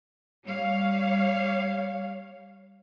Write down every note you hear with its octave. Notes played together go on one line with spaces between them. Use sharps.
G3 C#5 F5